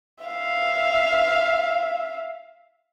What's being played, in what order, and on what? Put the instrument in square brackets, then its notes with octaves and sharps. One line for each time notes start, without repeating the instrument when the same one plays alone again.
[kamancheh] E5 F5